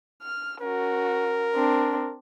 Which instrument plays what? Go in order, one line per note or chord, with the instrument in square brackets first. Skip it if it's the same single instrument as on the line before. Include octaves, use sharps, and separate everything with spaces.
[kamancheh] F6
[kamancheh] C#4 F#4 [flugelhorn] A#4
[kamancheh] C4 D4